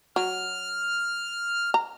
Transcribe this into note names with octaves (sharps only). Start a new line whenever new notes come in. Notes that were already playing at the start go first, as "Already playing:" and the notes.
F#3 F6
A#5